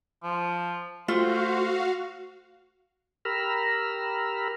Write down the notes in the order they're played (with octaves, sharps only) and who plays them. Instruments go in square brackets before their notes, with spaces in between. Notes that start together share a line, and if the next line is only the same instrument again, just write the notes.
[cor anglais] F3
[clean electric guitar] A3 [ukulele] F4 [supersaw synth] F#4 F5 [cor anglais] C5
[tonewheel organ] G4 A#4 A#5 B5 E6 F6